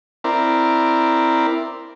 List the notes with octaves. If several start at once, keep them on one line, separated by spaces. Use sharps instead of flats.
C4 E4 A#4 D5